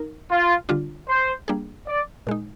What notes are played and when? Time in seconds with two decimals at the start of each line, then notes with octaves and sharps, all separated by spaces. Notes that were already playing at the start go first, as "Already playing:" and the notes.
Already playing: D#4 A#4
0.30 F4
0.69 D3 G3 D4 F4
1.08 C5
1.48 G3 A#3 D4 G#4
1.87 D5
2.27 A#2 G#3 D#4